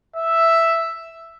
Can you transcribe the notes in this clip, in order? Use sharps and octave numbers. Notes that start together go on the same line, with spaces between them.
E5